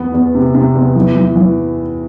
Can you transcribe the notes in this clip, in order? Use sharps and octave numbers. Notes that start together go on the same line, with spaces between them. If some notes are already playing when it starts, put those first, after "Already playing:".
Already playing: E2 B3
E2
C3
C3
E2
E3
E3
E3